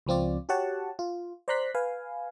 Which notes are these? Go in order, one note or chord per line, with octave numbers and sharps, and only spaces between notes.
C#2 F3 C4 F4 D5
F#4 G4 C#5 F#5 A5
F4
C5 D5 A#5 C6 F#6 B6
B4 F5 G#5